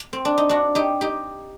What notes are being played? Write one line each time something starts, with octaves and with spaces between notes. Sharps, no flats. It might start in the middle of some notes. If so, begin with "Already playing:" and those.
Already playing: A#3
C4
D4
D#4
D4 F#4
D#4 G4
D#4 G4